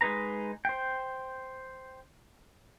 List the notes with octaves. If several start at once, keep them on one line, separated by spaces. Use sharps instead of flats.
G#3 D#4 B4 A#5
C5 G5